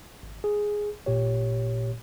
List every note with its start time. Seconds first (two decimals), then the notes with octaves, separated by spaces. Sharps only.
0.23 G#1
0.44 G#4
1.06 G#1 A#2 G4 C#5